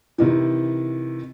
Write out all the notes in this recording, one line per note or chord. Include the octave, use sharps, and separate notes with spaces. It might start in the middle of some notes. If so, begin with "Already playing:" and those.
C3 D#3 E3